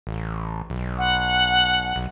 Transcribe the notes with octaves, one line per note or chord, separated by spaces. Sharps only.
A1
B1
F#5
B1